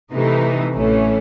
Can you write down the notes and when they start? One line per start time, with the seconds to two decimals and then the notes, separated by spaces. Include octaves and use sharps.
0.12 C3 E3 A3 D#4
0.75 A1 A2 E3 A3 C#4